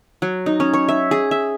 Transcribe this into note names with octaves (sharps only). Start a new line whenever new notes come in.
F#3
D#4
C#4
C#5
E5
G#4
E5